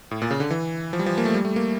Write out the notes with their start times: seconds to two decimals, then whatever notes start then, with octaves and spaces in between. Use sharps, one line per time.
0.11 A2
0.22 A#2
0.31 C#3
0.40 D3
0.51 E3
0.93 F3
0.99 G3
1.06 F3
1.18 A#3
1.25 A3
1.34 G3
1.45 A3
1.56 A#3